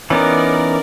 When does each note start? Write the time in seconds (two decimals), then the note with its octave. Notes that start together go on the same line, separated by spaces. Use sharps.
0.10 E3 B3 C#4 D#4 A#4 D5